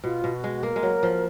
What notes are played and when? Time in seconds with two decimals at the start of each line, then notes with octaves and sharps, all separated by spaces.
0.04 B2 F4
0.24 B2
0.34 F#4
0.44 G#3
0.63 A#3 A#4
0.76 G#3
0.83 F#3
1.03 F3